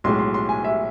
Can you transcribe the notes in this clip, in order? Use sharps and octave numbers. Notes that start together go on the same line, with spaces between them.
B1 A2 G#3 C6
C6
C6
G#5
E5